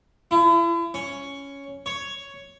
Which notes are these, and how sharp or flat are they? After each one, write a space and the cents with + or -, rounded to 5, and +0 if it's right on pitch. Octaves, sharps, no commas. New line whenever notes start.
E4 +40
C#4 +5
C#5 +5